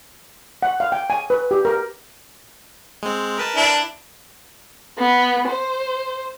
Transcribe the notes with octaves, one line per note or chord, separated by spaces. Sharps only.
F#5
F5
G5
G#5
B4
G4
A#4
G#3 C4
A#4 B4 A5
D4 E4
B3
C5